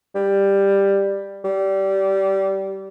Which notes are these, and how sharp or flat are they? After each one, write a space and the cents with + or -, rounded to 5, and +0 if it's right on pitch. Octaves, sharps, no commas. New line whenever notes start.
G3 +10
G3 -20